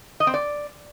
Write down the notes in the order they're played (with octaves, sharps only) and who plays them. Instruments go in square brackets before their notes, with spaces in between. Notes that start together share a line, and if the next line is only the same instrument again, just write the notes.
[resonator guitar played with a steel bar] D#5
C4
D5